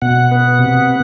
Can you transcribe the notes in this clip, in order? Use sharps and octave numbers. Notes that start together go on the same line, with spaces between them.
B2 F#5
B3
C3